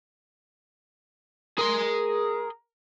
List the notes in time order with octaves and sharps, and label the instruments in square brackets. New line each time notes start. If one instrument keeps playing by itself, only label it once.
[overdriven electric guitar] G#4 C6 [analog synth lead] A#4